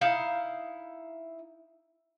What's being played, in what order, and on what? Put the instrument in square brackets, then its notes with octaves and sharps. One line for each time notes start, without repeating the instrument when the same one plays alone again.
[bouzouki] D#4 E4 F5